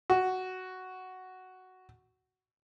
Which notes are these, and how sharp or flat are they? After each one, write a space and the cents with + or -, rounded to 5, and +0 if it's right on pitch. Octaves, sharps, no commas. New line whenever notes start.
F#4 +5